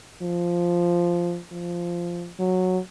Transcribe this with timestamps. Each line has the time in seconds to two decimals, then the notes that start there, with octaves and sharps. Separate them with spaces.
0.22 F3
1.52 F3
2.39 F#3